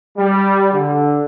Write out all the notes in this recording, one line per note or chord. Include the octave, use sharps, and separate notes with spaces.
G3
D3